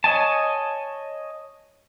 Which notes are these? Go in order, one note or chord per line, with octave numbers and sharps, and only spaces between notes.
C#5 D#5 G#5 A5